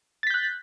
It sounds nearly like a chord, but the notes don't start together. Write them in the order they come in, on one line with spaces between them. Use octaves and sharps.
A6 B6 G6 F#6